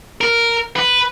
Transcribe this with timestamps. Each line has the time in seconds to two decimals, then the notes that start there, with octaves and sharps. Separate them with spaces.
0.21 A#4
0.76 B4